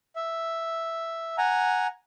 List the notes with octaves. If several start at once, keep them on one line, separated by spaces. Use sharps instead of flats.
E5
F#5 G#5 A#5